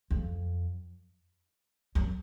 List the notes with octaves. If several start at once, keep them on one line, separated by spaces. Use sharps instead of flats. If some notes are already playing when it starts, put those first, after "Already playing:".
F2
F#2